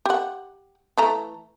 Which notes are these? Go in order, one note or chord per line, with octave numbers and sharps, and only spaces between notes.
G4 F#5
E3 A3 A#5